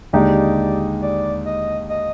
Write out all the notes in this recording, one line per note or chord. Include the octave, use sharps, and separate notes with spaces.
D#2 D3 G#3 D#4 G4 D5
D5
D#5
D#5